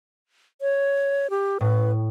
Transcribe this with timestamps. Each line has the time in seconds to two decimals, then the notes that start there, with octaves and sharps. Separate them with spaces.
0.61 C#5
1.30 G4
1.61 A2 B4